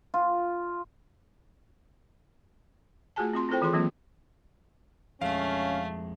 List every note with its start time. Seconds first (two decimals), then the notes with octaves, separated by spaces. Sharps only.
0.14 F4
3.16 A3 F4 F#4 G#4 G#5 A5
3.33 C4 F4 C6
3.49 C4 E4 F4 A4 C5 G5
3.61 D#3 E3 F4 G#4 C6
3.73 E3 F#3 A#3 C4 F4
5.22 F2 G#3 A3 C#4 F5